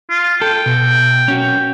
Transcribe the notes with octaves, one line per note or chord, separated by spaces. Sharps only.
F4
A4 G5
B2
C#4 F#4